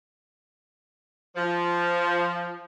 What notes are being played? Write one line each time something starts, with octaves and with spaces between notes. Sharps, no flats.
F3